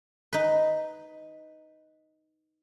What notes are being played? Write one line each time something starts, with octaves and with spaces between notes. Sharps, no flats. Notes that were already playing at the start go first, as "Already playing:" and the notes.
D#4 B4